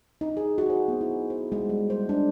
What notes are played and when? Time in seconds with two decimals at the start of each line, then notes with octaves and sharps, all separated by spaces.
0.21 D#4
0.37 G#4
0.58 F#4
0.70 C5
0.88 B3
1.01 E4
1.30 C5
1.52 G#3
1.69 G3
1.90 C5
2.09 D4